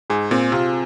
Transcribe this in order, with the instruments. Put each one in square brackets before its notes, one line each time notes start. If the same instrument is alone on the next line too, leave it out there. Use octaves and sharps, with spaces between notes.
[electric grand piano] G#2 [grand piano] G#4
[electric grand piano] A#2 [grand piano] C4
[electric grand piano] C3 [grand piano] F4